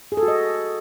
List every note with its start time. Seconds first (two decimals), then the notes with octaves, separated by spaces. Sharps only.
0.12 G#4
0.17 A4
0.23 F#4
0.28 D#5